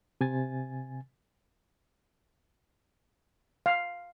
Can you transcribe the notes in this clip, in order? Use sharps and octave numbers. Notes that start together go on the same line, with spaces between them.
C3 G#5 A6
F5